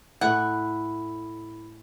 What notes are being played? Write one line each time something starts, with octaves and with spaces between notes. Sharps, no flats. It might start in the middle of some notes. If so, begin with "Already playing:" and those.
A2 A3 E4 F#5